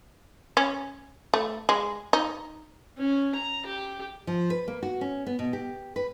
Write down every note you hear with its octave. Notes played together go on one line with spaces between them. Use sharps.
C#4
A3
G#3
D#4
C#4
A#5
G4
F3
B4
A#3
F#4
C#4
B3
B2
G4
B4